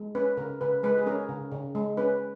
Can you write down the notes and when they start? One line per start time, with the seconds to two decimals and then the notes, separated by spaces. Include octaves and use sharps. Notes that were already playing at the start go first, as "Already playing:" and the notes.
Already playing: G#3
0.15 C#4 B4
0.37 C#3 A#4
0.61 C#3 B4
0.83 G#3 B4
0.98 G#4
1.06 C#4 A#4
1.29 C#3
1.52 C#3
1.75 G#3
1.97 C#4 B4